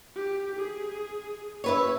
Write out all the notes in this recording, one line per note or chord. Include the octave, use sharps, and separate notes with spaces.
G4
G#4
E4 B4 C#5